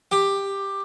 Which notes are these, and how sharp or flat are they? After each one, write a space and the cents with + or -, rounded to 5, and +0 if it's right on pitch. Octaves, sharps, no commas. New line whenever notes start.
G4 +10